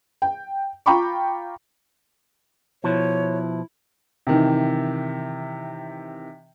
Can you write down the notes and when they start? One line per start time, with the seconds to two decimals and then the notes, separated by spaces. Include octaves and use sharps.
0.22 G5
0.86 F4 G5 A#5 B5 C#6 D6
2.84 B2 F3 E4 C#5
4.27 C3 D#3 E3